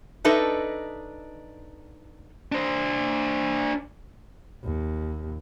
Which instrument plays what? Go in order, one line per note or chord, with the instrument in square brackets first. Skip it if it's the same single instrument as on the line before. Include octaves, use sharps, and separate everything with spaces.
[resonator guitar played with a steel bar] D4 D#4 A4 B4 D#5 E5
[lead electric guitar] D4 C5
[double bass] D#2